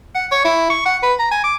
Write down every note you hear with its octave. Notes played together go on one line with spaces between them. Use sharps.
F#5
C#5
E4
C#6
F#5
B4
A#5
G#5
D6